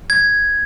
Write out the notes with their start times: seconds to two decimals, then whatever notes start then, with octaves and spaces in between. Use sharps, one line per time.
0.10 G#6